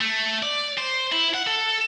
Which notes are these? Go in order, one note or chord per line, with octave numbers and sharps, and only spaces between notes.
A3
D5
C5
E4
F#5
A4